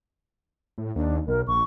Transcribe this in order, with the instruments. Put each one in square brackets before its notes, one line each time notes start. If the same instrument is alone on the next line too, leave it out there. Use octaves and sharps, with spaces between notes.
[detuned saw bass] A2
[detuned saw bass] D#2 [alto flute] D4
[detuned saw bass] B1 [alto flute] A#4
[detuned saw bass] A#1 [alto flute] C#6